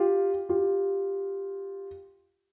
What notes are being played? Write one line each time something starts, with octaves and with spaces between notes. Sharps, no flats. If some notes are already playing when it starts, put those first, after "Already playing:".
Already playing: F4 G4
F4 G4